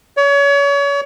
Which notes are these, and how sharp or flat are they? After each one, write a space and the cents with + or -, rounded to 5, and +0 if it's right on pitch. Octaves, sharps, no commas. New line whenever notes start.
C#5 +35